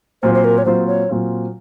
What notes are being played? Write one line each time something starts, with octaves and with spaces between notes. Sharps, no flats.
A#2 F#3 C4 F4 C5
C5
A#4
C#5
A#2 F#3 C4 F4 C5
C#5
A#2 F#3 C4 F4